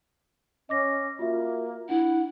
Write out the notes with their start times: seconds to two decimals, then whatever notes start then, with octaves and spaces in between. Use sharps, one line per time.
0.69 C#4 D#5 D6 A#6
1.19 A#3 F4 F#4 E5
1.89 D4 E4 F#5